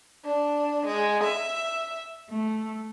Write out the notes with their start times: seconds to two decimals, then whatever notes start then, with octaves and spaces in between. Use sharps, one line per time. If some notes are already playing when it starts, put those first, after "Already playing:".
0.24 D4
0.86 G#3
1.23 E5
2.29 A3